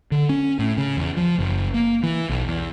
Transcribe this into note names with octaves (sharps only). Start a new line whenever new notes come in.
D3
C#4
A2
C#3
E2
F3
F#1
A#3
E3
B1
E2